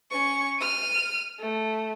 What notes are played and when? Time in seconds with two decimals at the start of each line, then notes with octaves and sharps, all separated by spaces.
0.11 C#4 C#6
0.58 F6 D#7
1.39 A3